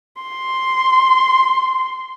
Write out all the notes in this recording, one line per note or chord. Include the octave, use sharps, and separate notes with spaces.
C6